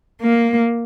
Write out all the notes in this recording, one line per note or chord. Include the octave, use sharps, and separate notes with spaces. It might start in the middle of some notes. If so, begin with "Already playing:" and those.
A#3